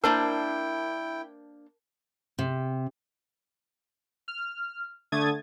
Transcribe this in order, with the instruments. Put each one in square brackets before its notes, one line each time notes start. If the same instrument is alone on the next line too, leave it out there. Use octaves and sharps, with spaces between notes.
[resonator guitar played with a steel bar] A#3 D4 C5 [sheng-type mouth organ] E4 G5 [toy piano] A#4 A5
[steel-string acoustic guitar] C3
[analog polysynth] F6
D3 A3 D#6 G#6 A6